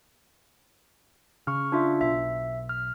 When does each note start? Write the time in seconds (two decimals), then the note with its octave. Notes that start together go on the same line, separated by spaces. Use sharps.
1.47 C#3 C#6 F6
1.72 D4 F4 E5
2.01 B1 E5
2.69 F6